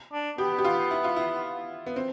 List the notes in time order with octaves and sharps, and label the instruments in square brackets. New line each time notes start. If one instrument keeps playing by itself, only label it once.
[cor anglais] D4
[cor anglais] B3 [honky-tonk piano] G4
[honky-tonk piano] G4
F4
E4
F4
E4
B3
C4